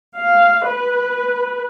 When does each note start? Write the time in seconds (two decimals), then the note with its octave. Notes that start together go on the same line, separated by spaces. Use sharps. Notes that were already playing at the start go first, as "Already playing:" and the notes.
0.16 F5
0.66 B4